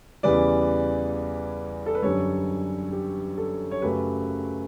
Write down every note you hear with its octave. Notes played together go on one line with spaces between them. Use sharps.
E2 C#3 E3 G3 B4 D5
A4
B4
F#2 D3 G3 A4 C#5
G4
A4
C#5
F#2 C#3 F#3 A3 G4 B4